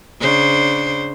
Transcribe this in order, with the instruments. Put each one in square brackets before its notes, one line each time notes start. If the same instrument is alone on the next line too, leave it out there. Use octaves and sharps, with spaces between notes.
[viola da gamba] C#3 D4 C5